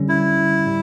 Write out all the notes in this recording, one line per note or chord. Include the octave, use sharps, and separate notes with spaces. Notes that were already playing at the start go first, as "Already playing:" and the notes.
Already playing: D3 G3 C#4
E4
A2 G3